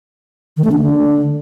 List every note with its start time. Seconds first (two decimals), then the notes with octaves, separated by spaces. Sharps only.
0.57 D#3
0.64 A3
0.72 D4
0.79 D3